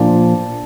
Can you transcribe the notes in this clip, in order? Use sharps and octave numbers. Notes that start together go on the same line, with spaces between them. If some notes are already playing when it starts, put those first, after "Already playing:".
Already playing: A#2 F3 A#3 D4